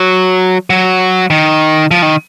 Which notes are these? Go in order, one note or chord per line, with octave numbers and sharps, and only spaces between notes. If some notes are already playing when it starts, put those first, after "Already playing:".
Already playing: F#3
F#3
D#3
F3
D#3